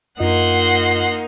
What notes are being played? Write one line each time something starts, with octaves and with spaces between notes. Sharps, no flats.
F#2 A#3 D#4 F4 D#5 F#5 C6